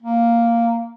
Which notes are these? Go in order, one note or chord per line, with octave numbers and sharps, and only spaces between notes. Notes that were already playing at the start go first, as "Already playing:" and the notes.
A#3